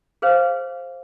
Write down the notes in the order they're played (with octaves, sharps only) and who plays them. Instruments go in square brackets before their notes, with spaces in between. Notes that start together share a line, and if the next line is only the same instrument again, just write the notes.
[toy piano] G#4 B4 C5 F5